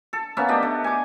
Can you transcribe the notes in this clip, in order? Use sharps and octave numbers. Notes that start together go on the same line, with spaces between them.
A4
A#3 B3 C#4 E5
A3 D4 G4 D#5
A3
G#5 D6